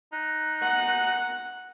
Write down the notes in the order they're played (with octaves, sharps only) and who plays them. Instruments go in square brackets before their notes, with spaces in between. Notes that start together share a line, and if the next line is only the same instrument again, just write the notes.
[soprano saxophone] D#4 [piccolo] F#6
[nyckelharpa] F#5